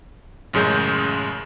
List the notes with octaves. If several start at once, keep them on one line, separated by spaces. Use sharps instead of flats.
A1 F#2 C#3 G#3 G6